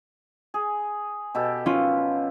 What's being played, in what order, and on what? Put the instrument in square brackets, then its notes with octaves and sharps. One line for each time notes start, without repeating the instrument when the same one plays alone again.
[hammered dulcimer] G#4
B2 G4 A4
[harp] C#4 F4